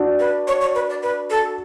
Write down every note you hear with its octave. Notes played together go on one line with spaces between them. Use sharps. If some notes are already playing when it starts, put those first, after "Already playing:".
Already playing: D4 F#4
B4
C#5
C#5
B4
D5
B4
A4